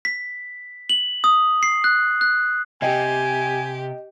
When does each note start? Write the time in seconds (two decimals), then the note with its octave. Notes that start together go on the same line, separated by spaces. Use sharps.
0.05 B6
0.89 F#7
1.24 D#6
1.63 C7
1.84 F#6
2.21 F#6
2.82 C3 G4 D#5 G5 G#5